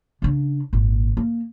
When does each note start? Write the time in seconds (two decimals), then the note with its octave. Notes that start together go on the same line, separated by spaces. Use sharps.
0.22 C#3 D4
0.73 G#1 A#2
1.17 A#3